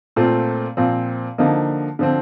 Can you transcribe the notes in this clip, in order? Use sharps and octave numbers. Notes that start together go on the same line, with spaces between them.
A#2 A3 C4 F4
A#2 F3 C4
D3 F3 A#3 D#4
D3 F3 C4